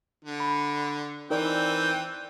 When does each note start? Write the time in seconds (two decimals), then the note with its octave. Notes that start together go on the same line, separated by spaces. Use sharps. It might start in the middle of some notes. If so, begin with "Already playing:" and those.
0.24 D3
0.40 B5
1.30 E3 C4 D#4 A#4 D5 G5